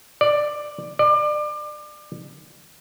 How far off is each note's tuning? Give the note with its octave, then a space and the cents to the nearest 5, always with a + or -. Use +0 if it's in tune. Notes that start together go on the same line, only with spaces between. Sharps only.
D5 +10
D5 +30